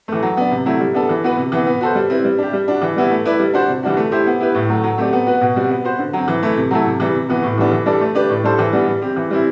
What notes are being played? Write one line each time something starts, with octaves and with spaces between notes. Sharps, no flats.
E3 A3
F#3
B3 D4
C3
F#3 A3 C4 E4
G3
B3 D4 A4
E3
B3 F#4 B4
C3
E3 B3
B3
F#4 A4 C5
G3
C4 E4 B4
G3
D4 G4
G3
D4 F#4
E3
G3 B3 E4
A3
E4 B4 D5
G3
D4 F#4 C5
C3
E3 G3 D4 F#4
A3
E4 G4 C5
B3
E4 G4 B4
A2
F#3 A3
F#3
A3 C4 G4 D5
B3
F#4 B4
B2
G3 C4 F#4
B3
F#4 C5
D3
F#3 C4
E3
A3 E4
C3
F#3 A3 E4 A4
C3
E3 G3
C3
E3 B3 F#4
A2
E3 G3 B3 D4
E3
G3 D4 A4 D5
A3
D4 G4 B4 D5
A2
G3 D4 A4 C5
E3
G3 B3 D4
G3
C4 G4
E3
G3 C4 E4